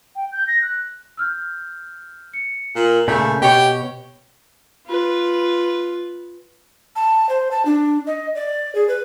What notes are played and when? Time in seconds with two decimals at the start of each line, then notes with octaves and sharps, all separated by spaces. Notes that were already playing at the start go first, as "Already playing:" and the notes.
0.15 G5
0.32 G6
0.47 A#6
0.62 F#6
1.17 E6 F6 G6
2.34 C#7
2.76 A#2 A#4 F#7
3.08 A#2 C#3 A3 G6 B6
3.42 B2 G4 C#5
4.87 F4 B4
6.96 A5
7.29 C5
7.51 A5
7.66 D4
8.07 D#5
8.35 D5
8.75 G#4
8.88 B4